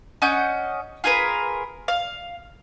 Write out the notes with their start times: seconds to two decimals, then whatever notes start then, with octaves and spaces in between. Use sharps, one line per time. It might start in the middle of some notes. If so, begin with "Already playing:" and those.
0.22 C#4 D#5 F#5 G6
1.04 F4 G#4 A#4 B4
1.88 F5